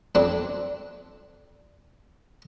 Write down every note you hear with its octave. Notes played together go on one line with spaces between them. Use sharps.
F2 C4 D4